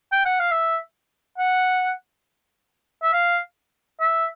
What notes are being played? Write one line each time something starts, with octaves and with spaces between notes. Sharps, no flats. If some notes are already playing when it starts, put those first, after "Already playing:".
G5
F#5
F5
E5
F#5
E5
F5
E5